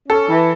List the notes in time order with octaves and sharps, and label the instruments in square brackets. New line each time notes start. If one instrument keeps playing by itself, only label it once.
[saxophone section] C#4 [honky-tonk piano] A4
[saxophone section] E3